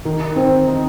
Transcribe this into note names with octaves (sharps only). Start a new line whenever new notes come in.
D#3
C4
D#4